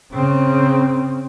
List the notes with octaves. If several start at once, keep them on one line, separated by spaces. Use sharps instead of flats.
C#3 C4